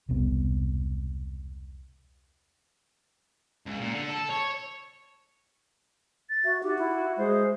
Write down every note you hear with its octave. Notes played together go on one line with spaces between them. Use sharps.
E1 C2 C3 B3
C#2
A#2
D3
A4
C#5
A6
F#4 E5
D#4 F#4 G4
E4 E5
G#3 C5